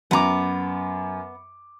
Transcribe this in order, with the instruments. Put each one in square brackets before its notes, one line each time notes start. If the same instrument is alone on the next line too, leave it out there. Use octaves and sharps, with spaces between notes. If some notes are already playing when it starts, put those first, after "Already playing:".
[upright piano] F#2 D6 [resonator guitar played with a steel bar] B3 A#5